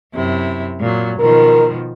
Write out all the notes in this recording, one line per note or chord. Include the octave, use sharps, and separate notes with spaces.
F#2 C3 E4
A#2 F#3
B2 D#3 F3 A#4